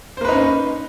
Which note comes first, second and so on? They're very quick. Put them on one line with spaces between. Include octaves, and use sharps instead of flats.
C5 A#3 B4 D#4 C#4